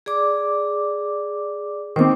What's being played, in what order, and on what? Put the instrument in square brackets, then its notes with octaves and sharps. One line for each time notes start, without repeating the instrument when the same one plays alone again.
[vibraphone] G#4 D5 D6
[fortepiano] D#3 C4 [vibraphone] C5 D6